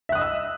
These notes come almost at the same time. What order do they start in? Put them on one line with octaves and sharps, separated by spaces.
E5 F#6 D#6 D#5 E6